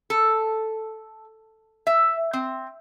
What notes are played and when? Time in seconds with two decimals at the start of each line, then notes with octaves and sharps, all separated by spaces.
0.10 A4
1.87 E5
2.33 C4